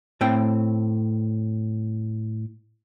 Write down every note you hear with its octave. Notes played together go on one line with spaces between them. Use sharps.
A2 A3 C4 G5